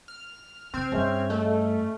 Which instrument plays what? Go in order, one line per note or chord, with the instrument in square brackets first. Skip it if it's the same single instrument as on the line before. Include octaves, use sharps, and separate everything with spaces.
[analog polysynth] F6
[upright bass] C#3 [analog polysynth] C4 F6 G#6
[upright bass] G2 [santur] C#4 G#4 E5
[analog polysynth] A3 [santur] D#5